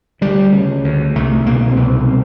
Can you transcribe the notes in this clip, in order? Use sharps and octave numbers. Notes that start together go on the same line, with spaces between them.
D2 G3
C#3
D2
C2 A3
B2 A#3
C4
C2 B3
C4